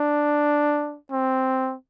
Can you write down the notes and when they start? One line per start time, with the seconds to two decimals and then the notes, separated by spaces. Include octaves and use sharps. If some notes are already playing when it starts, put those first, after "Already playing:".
Already playing: D4
1.12 C4